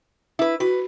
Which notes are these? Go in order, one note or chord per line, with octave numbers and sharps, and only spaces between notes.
E4 B4
E4 F#4 B4